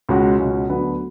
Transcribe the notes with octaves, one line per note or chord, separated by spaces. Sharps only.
C#2 B2 G#3 C#4 F#4
C#2 B2 G#3 C#4 F#4
D2 D3 F#3 B3